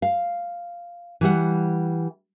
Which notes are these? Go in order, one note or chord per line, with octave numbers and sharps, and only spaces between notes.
F5
E3 G3 F#5